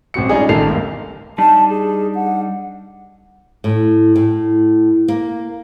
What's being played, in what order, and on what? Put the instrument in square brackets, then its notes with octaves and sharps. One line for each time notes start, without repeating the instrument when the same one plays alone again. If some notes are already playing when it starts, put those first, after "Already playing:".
[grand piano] A1 C4 F#4 C#7
G3 G#3 C#4 D#4 F4 G#4
A1 D#3 A4 A#4 C7 F7
G1 C#2
[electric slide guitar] G3 D4 D#4 [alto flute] A5
[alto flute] G#4
F#5
[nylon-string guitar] A2
A2
A#3